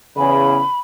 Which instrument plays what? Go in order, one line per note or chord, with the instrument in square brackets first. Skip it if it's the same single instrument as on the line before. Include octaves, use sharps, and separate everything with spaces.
[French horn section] E2 C#3 [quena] B5